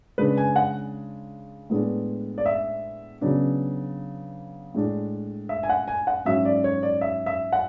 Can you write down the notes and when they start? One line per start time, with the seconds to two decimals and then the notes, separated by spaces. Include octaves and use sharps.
0.18 C#3 G#3 D4 B4
0.38 G#5
0.56 F#5
1.70 A2 G#3 B3 D4
2.38 D5
2.46 E5
3.21 C#3 F#3 B3 D4
4.74 A2 G#3 D4
5.49 E5
5.63 G#5
5.69 F#5
5.88 G#5
6.07 F#5
6.25 G#2 F#3 C#4 E5
6.45 D5
6.64 C#5
6.83 D5
7.01 E5
7.26 E5
7.52 F#5